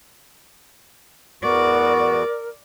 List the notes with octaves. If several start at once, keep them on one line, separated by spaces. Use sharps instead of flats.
E2 B3 F#4 A#4 D5